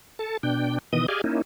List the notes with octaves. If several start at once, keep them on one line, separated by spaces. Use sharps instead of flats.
A4 A5
B2 D4 G5
B2 D#3 E3 B3 D#5 D#6
G4 G#4 D5 D#5 F5 G#5
A#3 C#4 D#4 E4